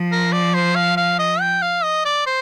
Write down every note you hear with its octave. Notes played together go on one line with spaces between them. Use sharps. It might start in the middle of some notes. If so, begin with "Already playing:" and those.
Already playing: F3
A#4
D5
C5
F5
F5
D#5
G5
F5
D#5
D5
C5